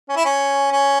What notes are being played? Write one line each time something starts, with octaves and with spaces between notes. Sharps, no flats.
C#4
E4
C#4
C#4